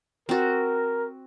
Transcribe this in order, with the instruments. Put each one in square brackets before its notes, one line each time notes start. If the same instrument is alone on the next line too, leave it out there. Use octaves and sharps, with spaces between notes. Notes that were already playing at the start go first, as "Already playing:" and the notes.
[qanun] C4 F#4 [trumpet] A#4